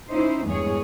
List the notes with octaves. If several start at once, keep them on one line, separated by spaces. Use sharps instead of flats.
C#4 D#4 E4 C5
E2 G2 G#3 G#4 C#5